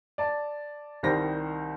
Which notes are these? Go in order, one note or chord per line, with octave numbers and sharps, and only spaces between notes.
D5 A5
C2 D#3 G3 C5 A#6